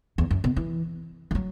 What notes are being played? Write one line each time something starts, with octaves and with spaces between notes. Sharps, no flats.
E2
F#2
B2
E3
E3
F#3